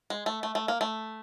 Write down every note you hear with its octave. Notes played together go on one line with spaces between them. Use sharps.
G#3
A3
A3
A3
A#3
A3